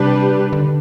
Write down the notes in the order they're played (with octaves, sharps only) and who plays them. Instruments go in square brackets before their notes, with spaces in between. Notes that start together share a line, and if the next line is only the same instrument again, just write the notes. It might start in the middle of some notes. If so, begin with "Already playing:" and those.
Already playing: [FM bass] C3 [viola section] G3 D4 G4 B4
[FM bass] D3